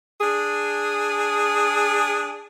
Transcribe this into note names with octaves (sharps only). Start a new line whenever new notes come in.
D4 G#4